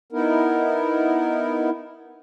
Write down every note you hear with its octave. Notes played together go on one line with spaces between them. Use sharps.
B3 D#4 E4 A#4